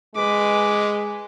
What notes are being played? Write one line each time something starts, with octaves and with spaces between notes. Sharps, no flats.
G#3 B4 D6